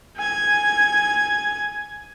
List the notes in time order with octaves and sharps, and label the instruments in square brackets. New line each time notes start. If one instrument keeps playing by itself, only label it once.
[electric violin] G#5 G#6